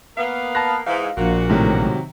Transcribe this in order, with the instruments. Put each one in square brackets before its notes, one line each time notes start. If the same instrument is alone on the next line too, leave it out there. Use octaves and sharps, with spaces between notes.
[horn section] A#3 B3 F5
[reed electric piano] A5 B5 F#6 [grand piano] A#6
[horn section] G#2 E3 [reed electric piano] F5
[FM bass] A#1 [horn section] A#2 A#3 F#4
[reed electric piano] A2 G#3 [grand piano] C3 D#3 F#3